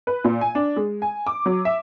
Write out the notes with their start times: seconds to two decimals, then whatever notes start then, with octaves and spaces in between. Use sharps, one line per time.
0.07 B4
0.24 A#2
0.41 G#5
0.55 D4
0.76 G#3
1.02 G#5
1.27 D6
1.46 F#3
1.65 E5